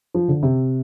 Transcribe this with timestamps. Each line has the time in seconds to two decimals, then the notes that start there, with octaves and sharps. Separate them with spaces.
0.14 F3
0.28 D3
0.43 C3